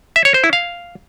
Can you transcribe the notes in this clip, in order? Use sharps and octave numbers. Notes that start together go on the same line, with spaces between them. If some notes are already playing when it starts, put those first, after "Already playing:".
E5
C#5
C5
E4
F5